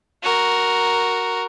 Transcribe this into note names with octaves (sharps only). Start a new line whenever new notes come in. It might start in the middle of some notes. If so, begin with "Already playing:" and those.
F#4 A#4